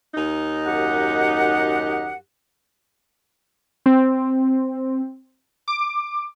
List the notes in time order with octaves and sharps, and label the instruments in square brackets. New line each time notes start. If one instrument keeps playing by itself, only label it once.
[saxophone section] D#2 D#4
[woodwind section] F#2 G4 F#5
[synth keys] C4
D6